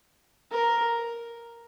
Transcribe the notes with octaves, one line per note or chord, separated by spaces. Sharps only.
A#4